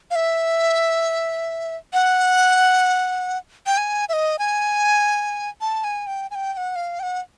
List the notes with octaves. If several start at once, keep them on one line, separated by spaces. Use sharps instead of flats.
F5
E5
F#5
G5
G#5
E5
D#5
G#5
A5
G#5
G5
G#5
G5
G5
F#5
F5
G5
F#5